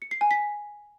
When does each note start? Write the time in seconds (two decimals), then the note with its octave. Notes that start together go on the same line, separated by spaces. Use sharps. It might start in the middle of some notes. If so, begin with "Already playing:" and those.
0.02 C#7
0.11 C7
0.21 G#5
0.31 B6